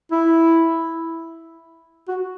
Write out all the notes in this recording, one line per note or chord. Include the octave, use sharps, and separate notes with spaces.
E4
F#4